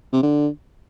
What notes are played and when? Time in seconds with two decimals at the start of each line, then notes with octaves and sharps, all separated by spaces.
0.13 C3
0.23 D3